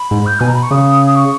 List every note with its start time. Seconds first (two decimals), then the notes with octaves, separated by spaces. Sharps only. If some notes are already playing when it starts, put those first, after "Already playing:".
Already playing: B5
0.11 G#2
0.26 G6
0.40 B2 G#5
0.48 A#5
0.55 B5
0.63 C#6
0.71 C#3 D#6
1.06 D#6
1.15 C#6